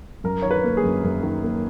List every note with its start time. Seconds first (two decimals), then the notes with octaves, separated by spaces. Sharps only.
0.24 F#2 A#4
0.42 D#3 C#5
0.51 B4
0.64 A#3
0.77 G#4
0.84 F#2
1.04 F#2
1.23 D#3
1.43 A#3